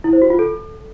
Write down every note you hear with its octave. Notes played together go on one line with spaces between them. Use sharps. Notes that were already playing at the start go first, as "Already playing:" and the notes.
E4
C5
F#4
F4
A4